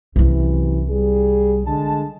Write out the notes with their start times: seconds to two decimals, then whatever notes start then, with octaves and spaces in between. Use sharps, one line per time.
0.16 C2 F#2 C3 E3 E4
0.90 G3 G#4
1.67 D3 G#3 A5